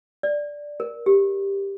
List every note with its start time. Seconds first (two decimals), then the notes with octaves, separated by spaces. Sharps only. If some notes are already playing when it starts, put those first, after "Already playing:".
0.23 D5
0.80 A#4
1.06 G4